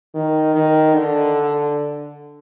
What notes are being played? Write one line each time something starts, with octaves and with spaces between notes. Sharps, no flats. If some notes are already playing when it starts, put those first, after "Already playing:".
D#3
D#3
D3